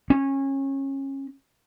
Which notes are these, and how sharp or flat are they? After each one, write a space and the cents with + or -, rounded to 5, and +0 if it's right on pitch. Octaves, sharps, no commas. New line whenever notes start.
C#4 -25